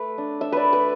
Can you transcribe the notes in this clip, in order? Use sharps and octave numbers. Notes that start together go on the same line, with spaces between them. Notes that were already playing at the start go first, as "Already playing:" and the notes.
Already playing: A3 B4
D4
D4 E5
B4 D5
A3
B4